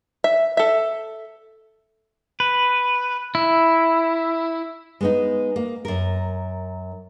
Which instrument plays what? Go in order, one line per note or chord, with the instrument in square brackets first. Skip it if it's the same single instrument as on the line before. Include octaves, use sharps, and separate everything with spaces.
[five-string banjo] E5
A4 E5
[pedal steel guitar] B4
E4
[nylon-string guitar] G#3 B3 D#4
A#3
F#2 A#4